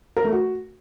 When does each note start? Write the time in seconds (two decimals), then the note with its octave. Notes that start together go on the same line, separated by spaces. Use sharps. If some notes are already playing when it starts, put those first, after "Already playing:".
0.17 A#4
0.24 A3
0.32 F#4